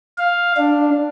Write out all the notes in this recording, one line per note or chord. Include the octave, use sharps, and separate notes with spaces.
F5
D4